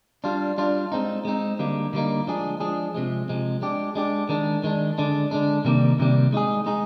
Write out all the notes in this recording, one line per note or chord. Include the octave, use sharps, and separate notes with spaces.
G3 D4 F4
G3 D4 F4
G#3 C4 D#4
G#3 C4 D#4
D3 G3 A#3 D#4
D3 G3 A#3 D#4
F3 G#3 D4 G#4
F3 G#3 D4 G#4
C3 F3 G#3
C3 F3 G#3
G#3 D4 G4
G#3 D4 G4
D#3 G#3 D4
D#3 G#3 D4
D3 G#3 D4
D3 G#3 D4
C3 D#3 G3 A#3
C3 D#3 G3 A#3
G#3 D#4 G#4
G#3 D#4 G#4